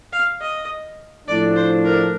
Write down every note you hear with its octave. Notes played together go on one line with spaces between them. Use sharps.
F5
D#5
A2 F3 A3 D4 D5
C5
A#4